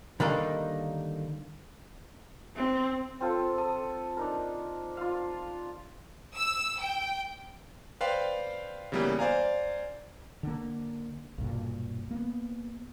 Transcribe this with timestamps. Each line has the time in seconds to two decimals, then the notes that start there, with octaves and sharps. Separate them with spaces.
0.20 D3 D#3 G3 A#3 D#4
2.56 C4
3.21 C4 F4 A4
3.58 A4 D#6
4.17 D4 D#4 A#4
4.97 F4 F5
6.35 E6
6.80 G5
8.01 B4 C5 D5 F5 G5 C6
8.92 C#3 E3 G3 A#3 B3
9.19 C5 D5 F5 G#5 A#5
10.43 D3 A#3
11.38 B1 G2 A#2
12.11 A#3 B3